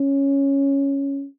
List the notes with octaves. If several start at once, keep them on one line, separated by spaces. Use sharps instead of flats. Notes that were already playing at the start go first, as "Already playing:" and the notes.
Already playing: C#4